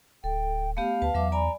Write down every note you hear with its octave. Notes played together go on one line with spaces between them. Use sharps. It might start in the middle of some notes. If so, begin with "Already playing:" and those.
D1 A4 G5
A3 B3 G4 F5
D2 B4 A5
E2 F#3 E5 D6
D5 G#5 A#5 B5